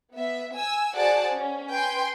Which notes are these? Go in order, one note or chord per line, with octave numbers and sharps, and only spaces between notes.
B3 E5
G#5 E6
F#4 G#4 C5 D5 F#5 A5
C#4
B4 G5 G#5 C6